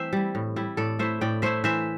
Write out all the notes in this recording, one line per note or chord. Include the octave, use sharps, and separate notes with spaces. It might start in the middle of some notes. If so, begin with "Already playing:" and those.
Already playing: E3 A3 C4 C5 E5
G3 E4
A2
G3 E4
A2 A4 D5
A3 E4 C5 E5
A2 D5 G5
A3 E4 C5 E5
E3 C5 E5